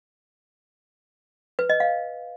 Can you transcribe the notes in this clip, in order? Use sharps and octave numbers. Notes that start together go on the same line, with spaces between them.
B4
D#5
F5